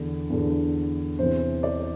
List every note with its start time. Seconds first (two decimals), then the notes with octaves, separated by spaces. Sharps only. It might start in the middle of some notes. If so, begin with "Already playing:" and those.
Already playing: E2 D3
0.30 E2 D3
1.19 E2 C3 E3 C5
1.63 D5